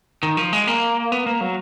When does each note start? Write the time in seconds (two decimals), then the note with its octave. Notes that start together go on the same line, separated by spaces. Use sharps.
0.23 D#3
0.37 F3
0.53 G#3
0.67 A#3
1.12 B3
1.26 A#3
1.41 F#3